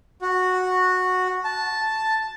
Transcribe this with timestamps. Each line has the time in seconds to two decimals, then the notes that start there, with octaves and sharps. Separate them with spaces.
0.22 F#4
1.44 A5